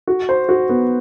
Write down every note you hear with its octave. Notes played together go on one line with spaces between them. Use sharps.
F#4
C5
F#4
B3